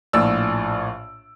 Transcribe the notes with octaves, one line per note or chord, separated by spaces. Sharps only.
A#1 A2 D5 E6